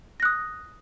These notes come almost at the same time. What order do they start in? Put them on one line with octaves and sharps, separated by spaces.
A#6 F#6 D#6